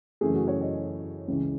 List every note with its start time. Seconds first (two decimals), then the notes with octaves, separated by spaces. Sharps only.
0.21 F#2 C#3 E3 A3 G#4
0.34 F#4
0.48 C#5
0.61 D#5
1.28 C#2 C#3 E3